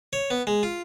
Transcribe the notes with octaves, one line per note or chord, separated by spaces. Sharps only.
C#5
B3
G#3
F4